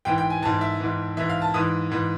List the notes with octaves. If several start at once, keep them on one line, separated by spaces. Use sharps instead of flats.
G#2 E3 G5
G5
G#5
G#2 E3 A5
E5
G#2 E3
G#2 E3 E5
F5
A5
G#2 E3 D#6
G#2 E3